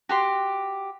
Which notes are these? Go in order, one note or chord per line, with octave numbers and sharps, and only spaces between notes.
F#4 G4 C6